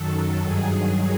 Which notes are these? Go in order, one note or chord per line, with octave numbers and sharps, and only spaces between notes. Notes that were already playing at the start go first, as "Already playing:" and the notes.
Already playing: F#2 D#3 F#3 A4
G2 D#3 F#3 G#4